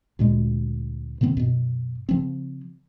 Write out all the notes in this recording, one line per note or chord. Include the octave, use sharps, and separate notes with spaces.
D2 A#2 G#3
C3 D#3 B3 C4
F#2 B2
C#3 F3 C4